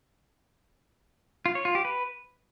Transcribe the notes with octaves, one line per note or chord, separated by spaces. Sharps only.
F4
C#5
F4
G4
B4